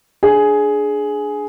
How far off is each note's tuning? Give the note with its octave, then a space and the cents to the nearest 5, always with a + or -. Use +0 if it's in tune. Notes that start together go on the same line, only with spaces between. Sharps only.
D4 +0 G#4 +10